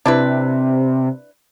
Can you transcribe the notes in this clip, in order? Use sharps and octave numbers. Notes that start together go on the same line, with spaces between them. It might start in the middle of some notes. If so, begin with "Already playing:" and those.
C3 D4 E4 B4